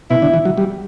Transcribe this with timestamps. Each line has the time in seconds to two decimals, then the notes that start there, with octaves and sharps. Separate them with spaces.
0.10 B2 E4
0.22 D3
0.34 E3
0.45 F#3
0.58 G3